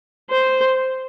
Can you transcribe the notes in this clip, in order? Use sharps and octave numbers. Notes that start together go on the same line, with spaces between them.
C5